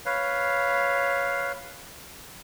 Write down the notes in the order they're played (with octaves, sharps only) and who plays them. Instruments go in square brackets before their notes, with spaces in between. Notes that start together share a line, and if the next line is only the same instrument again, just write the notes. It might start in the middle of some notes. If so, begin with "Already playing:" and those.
[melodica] B4 C#5 F5